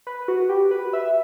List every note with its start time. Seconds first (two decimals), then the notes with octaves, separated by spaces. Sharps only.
0.07 B4
0.28 F#4
0.49 G4
0.71 B4
0.93 E5